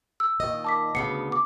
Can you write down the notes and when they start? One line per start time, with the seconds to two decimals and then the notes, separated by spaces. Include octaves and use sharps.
0.20 E6
0.40 A#2 D#3 D#5
0.64 A5 D6 B6
0.95 D2 C#3 B3 C7 C#7
1.32 D6